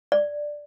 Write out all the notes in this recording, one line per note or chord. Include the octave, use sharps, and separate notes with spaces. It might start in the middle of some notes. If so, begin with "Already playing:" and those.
D5